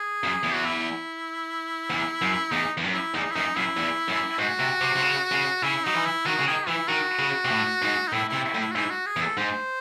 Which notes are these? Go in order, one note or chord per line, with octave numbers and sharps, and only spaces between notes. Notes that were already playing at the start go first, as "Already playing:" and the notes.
Already playing: G#4
F#2
E2
F#4
E4
E2
F#2
E2 D#4
E2
F#2
E4
E2 D#4
E4
F#2 D#4
F#2 E4
E2
F#2
G#2 F#4
C3
C3
C3
C#3
C#3
C#3 E4
F#3 D#4
E3
E4
D#3 F#4
C#3
D#3 G#4
E3 E4
D#3 F#4
C#3
C3
A2
G#2
D#4
A2 E4
C3 E4
E4
A2
E4
F#4
G#2 E4
F#4
G#4
E2
A4
G#2 C5